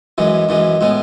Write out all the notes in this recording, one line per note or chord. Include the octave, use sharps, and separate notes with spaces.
F#2 E3 G#3
F#2 E3 G#3
A2 G#3 B3